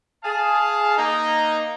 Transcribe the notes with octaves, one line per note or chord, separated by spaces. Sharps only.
G#4 F5 A5
A#3 D#4